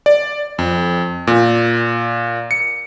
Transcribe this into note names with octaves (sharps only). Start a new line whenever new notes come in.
D5
F2
A#2
C#7